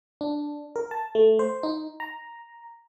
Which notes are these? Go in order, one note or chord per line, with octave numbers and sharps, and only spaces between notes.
D4
A#4
A5
A3
C5
D#4
A#5